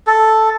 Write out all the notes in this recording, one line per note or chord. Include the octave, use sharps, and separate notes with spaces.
A4